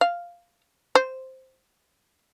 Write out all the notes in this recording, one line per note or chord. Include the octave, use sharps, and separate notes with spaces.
F5
C5